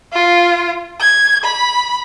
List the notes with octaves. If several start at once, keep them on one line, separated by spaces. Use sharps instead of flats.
F4
G#6
B5